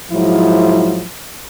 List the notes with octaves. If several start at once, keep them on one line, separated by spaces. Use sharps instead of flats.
G#2 F3 F#3 E4